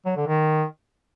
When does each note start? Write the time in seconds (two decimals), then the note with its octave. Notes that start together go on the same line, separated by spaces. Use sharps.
0.06 F#3
0.16 D3
0.27 D#3